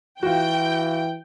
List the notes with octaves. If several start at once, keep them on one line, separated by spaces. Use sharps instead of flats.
E3 F4 F#4 G5